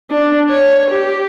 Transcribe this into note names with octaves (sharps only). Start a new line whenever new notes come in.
D4
C#5
G4